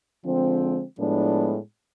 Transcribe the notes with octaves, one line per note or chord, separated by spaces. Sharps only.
D3 F3 G#3 C4
A2 F3 G#3 B3 D4